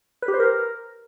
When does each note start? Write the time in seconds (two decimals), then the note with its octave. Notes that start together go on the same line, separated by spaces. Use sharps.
0.22 B4
0.28 G4
0.34 C5
0.40 A#4